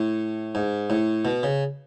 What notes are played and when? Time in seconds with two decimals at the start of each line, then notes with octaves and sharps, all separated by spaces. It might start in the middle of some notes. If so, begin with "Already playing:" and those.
Already playing: A2
0.55 G#2
0.90 A2
1.25 B2
1.43 C#3